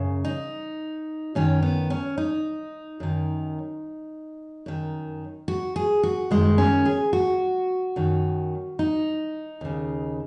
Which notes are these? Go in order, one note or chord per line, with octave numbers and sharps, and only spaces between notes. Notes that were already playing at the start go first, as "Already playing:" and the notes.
Already playing: F#2 C#3
D#4
F#2 D#3 C#4
B3
C#4
D#4
F#2 D#3
F#2 D#3
F#4
G#4
F#4
F#2 D#3 G#3
C#4
G#4
F#4
F#2 D#3
D#4
D#2 C#3